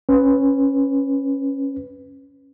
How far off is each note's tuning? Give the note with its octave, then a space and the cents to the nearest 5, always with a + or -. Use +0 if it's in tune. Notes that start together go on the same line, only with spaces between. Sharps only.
C#4 -15 B4 +5